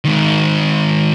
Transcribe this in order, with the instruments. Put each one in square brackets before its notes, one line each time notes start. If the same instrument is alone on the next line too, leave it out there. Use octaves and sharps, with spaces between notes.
[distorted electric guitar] G#2 D#3